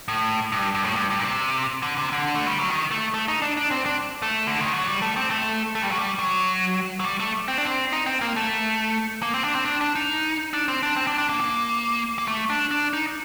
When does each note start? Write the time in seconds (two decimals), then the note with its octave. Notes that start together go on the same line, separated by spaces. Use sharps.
0.08 A2
0.52 G2
0.75 G2
0.85 A2
0.96 G2
1.10 G2
1.20 A#2
1.24 C3
1.82 D3
1.97 C3
2.12 D3
2.35 A3
2.48 G3
2.59 F#3
2.69 D#3
2.91 A3
3.14 A3
3.28 D#4
3.42 D4
3.57 D4
3.71 C4
3.86 D4
4.22 A3
4.47 D3
4.61 D#3
4.74 F#3
4.88 G3
5.02 A3
5.17 C4
5.30 A3
5.75 A3
5.83 G3
5.91 F#3
5.99 G3
6.19 F#3
7.00 F#3
7.05 G3
7.20 A3
7.48 C4
7.58 D4
7.65 C4
7.93 D#4
8.06 C4
8.21 A#3
8.36 A3
9.23 A#3
9.34 C4
9.44 D4
9.55 C4
9.66 D4
9.81 D4
9.95 D#4
10.53 D4
10.68 C4
10.83 D4
10.96 C4
11.07 D4
11.18 D4
11.29 A#3
11.40 A#3
12.18 A#3
12.28 A3
12.50 D4
12.71 D4
12.93 D#4